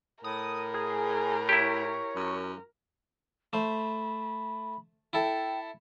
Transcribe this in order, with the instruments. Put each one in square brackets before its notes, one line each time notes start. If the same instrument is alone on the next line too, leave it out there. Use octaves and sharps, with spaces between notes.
[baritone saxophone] A2 [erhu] A#4 [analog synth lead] D#6
[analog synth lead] G#4
[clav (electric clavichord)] E4 G4 [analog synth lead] C#5
[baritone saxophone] F#2
[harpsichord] A3 C5 [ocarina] B5
[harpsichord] E4 A4 [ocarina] G5